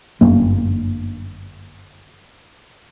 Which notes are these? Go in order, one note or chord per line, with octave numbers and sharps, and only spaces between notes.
G1 F#2 A#3